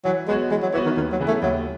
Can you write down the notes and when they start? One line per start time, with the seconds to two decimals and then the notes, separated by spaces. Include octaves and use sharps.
0.05 E3 F#3
0.28 G#3 B3 F#4 C#5
0.51 E3 G#3
0.62 F#3
0.73 E3 B3 F#4 C#5
0.85 D#3
0.97 D#2 D#3
1.12 F#3
1.20 C#3 E3 B3 E4
1.28 A3
1.42 D#2 F#3